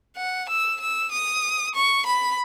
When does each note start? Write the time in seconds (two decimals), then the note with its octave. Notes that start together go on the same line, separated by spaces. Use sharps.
0.17 F#5
0.49 E6
0.80 E6
1.12 D#6
1.75 C#6
2.06 B5